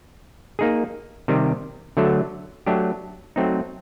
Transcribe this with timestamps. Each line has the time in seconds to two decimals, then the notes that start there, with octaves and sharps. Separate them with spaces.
0.59 A#3 D#4 G#4
1.28 C3 D#3 G3
1.97 D3 F#3 A3
2.66 F#3 A3 D4 G4
3.36 F#3 A3 C4 D#4